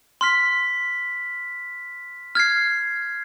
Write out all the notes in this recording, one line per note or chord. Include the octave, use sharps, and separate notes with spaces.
C6 F6 B6
F6 G#6 C7